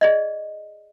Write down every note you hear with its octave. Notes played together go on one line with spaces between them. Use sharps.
G#4 D5 D#5